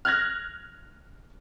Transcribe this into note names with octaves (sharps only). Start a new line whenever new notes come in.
F6 F#6 G#6 A#6